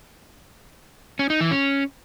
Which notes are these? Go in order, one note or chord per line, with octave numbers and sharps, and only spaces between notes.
C#4
D#4
E3
C#4